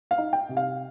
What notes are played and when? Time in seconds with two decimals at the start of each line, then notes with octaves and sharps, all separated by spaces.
0.11 F5
0.18 D#4
0.33 G5
0.49 C3
0.57 F5